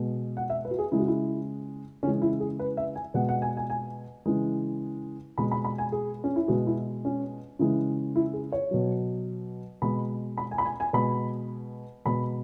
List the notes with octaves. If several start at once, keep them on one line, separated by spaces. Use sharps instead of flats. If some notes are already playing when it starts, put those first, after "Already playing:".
Already playing: B2 G#3
F#5
E5
B4
F#4
G#4
C#3 G#3 E4
F#4
E4
C#3 E3 G#3 C#4
E4
G#4
B4
E5
G#5
B2 G#3 F#5
F#5
G#5
G#5
G#5
C#3 E3 G#3
B2 G#3 B5
B5
B5
G#5
G#4
C#4
E4
B2 G#3 F#4
E4
C#4
C#3 E3 G#3 E4
E4
G#4
C#5
B2 F#3
B2 G#3 B5
B5
G#5
B5
G#5
G#5
B2 G#3 B5
B2 G#3 B5